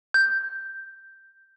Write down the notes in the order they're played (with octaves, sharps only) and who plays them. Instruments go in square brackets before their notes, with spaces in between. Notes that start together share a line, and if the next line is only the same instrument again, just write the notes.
[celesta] G6